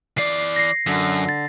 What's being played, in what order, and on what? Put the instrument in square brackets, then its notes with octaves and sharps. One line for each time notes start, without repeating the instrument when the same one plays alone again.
[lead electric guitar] E3 D5 [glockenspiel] C7
[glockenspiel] A#6 C7
[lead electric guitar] F#2 [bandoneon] D3
[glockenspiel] A6